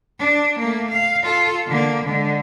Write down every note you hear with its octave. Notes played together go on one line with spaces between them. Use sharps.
D4
A3 A#3
F5
F4 A4
D3 A#3
D3 G#3